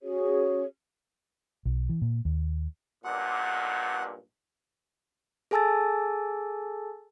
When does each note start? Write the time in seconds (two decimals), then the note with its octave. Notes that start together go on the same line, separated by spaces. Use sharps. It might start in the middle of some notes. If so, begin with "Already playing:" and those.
0.01 C#4 F#4 G#4 C#5
1.65 B1
1.89 E3
2.02 A#2
2.25 D#2
3.04 B1 G2 A#2 F#5
5.51 G#4 A4 G#5 A5 E6 A6